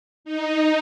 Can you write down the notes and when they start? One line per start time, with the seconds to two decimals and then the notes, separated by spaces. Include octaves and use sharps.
0.25 D#4